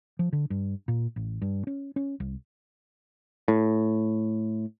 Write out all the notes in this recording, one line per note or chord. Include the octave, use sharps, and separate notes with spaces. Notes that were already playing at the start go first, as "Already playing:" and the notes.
F3
D3
G2
A#2
A1
G2
C#4
C#4
C2
A2